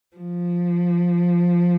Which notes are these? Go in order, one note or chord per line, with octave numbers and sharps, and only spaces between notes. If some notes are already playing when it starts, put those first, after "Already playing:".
F3